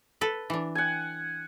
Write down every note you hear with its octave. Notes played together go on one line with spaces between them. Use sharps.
A4 B4
E3 D4
F#5 G#5